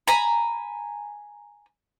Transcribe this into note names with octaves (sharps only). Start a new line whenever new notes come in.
G#5 A#5 B5